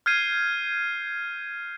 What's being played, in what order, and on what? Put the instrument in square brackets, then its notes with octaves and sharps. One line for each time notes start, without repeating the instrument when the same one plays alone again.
[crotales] F6 G6 G#6 C7 D#7